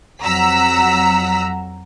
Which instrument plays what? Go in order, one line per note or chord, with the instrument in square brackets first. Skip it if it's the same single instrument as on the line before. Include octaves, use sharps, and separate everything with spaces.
[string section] F2 F#3 F#5 A#5 E6 B6